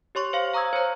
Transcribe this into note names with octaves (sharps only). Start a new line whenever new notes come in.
G4 C#5 C6 C#6
C5 F5 C6
F5 A#5 C#6 D#6 E6 G#6
C5 C#5 A#5